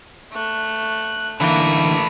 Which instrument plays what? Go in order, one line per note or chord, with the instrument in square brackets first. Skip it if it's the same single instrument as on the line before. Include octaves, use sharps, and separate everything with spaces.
[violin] A3 F#6
[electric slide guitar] D3 E3 [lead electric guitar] A3 B4 [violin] A#3 E5